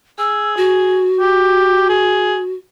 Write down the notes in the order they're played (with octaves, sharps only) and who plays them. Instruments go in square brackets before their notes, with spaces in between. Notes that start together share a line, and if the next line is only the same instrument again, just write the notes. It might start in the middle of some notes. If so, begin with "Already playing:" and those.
[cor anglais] G#4 [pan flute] E6
[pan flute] F#4
[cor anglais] G4
G#4